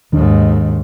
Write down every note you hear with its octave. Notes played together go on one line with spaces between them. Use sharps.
D#2 G#2 D#3 D4